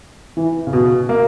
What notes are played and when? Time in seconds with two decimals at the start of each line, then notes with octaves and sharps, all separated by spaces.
0.37 E3
0.67 C#3
0.73 B2
1.09 A#3